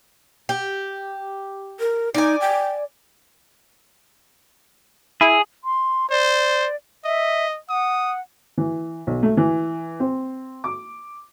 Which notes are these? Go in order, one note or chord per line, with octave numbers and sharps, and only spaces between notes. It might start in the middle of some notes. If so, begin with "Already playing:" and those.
G4
A#4
D#4 D5 G#5
G5
E4 G#4
C6
C5 D5
D#5 E5
F#5 D#6
E3
B1
A3
E3
C4
D6